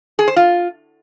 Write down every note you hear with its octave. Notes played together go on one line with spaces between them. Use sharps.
G#4
C5
F4